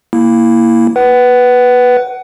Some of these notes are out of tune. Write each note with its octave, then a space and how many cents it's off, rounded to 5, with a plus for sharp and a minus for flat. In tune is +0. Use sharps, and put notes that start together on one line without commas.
A#3 +0 E4 +0
B4 +0 F#5 +25